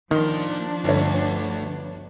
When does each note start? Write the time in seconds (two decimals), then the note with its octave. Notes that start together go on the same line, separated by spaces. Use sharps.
0.11 D#3 F3 A#3 D4 C6
0.84 G1 D2 C#5